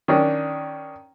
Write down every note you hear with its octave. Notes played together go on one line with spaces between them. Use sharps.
D#3 C#4 D4